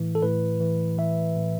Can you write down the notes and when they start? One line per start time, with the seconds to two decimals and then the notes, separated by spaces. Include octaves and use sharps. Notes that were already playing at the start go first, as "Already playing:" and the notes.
Already playing: A2 E3
0.15 A4
0.22 A2 B4
0.61 E3
0.98 E3 E5
1.36 A2